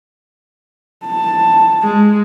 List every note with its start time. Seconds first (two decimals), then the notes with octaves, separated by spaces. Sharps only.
1.06 A5
1.83 G#3